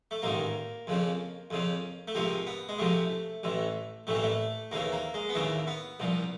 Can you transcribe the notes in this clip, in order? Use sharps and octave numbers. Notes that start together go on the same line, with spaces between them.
A3
A1 G#2 D#3 A#3
F2 C#3 F3
F2 C#3 F3
A3
C#2 C3 F3 A#3
B3
G#3
C#2 C3 F3 A3
A1 A2 E3
A1 A2 E3 A3
A#3
A3
D#2 C#3 E3 A#3
A#3
G#3
B3
D#2 C#3 E3 A#3
B3
C2 A#2 F3